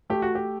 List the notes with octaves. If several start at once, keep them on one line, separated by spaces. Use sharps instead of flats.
A3 G4
F#4
G4